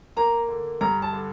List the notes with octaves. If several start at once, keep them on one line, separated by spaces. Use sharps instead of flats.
A#3 A#5
D3
G2 A#5
A5
D3